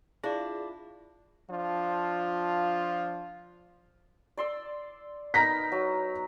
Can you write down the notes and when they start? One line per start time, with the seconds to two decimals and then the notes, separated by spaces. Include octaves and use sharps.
0.24 D4 E4 F4 G#4 D5
1.50 F3 D4 F4
4.37 D5 C6 E6
5.34 B3 D#4 A#4 A#5 A#6 B6
5.72 F#3